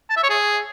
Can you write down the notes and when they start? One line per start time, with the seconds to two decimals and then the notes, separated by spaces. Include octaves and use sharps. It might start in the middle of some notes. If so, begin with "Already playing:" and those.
0.10 A5
0.17 E5
0.23 C#5
0.30 G#4